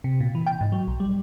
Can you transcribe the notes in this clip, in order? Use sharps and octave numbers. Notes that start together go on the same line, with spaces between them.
C3
A#2
E3
G5
G#2
F#3
B1
G3